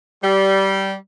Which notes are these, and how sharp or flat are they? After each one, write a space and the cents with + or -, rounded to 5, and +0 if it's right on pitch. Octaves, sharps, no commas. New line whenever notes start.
G3 -15